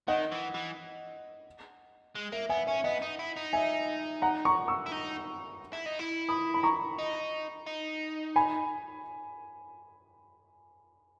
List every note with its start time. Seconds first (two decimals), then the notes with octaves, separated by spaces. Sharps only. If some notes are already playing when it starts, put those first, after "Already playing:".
0.08 D#3 D#5 F#5
0.32 E3
0.55 E3
2.15 G#3
2.32 A#3 E5
2.49 B3 E5 G#5
2.67 C#4 E5
2.84 B3 D#5 F#5
3.02 D#4
3.19 E4
3.36 D#4
3.53 E5 G#5
4.22 F#5 A#5
4.45 A#5 C#6
4.68 C#6 E6
4.86 E4
4.92 D#4
5.73 E4
5.86 D#4
5.99 E4
6.29 B5 D#6
6.54 B5
6.63 A#5 C#6
6.98 D#4
7.67 D#4
8.36 G#5 B5